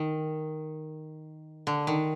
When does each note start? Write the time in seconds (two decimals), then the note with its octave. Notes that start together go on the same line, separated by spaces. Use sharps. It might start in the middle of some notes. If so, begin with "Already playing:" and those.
Already playing: D#3
1.67 D3
1.87 D#3